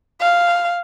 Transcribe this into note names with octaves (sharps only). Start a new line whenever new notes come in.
F5